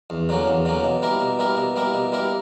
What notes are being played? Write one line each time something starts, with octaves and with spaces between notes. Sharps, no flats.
E2
D3 F#3 A#3 C#4
E2
D3 F#3 A#3 C#4
B2
G3 A#3 E4 A#4
B2
G3 A#3 E4 A#4
B2
G3 A#3 E4 A#4
B2
G3 A#3 E4 A#4